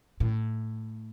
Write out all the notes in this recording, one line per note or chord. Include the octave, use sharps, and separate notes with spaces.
A2